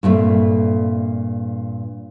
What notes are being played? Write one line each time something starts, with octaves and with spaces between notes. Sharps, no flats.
G2 A#2 A3 C4